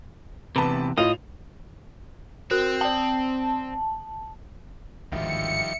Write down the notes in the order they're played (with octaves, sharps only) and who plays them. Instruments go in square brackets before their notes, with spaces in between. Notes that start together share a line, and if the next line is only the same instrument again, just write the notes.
[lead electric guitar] E2 C3 [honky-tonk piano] B4 A5
[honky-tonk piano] A2 F4 F7 [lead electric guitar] D#5
[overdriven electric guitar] C4 [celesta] F#4 A#4 F#6
[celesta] D5 G5 [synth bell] A5
[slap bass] G#1 D2 A2 [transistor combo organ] D#3 F3 G3 [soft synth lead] E5 [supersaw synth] C#7